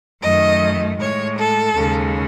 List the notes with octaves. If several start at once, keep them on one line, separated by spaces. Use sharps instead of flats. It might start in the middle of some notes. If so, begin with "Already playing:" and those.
F#2 D#3 A3 D#5
A2 G#3 C#5
A4
D#2 C#3 G#3